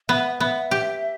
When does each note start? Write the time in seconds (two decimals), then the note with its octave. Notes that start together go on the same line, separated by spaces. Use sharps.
0.09 B3 E5
0.40 B3 E5
0.71 G4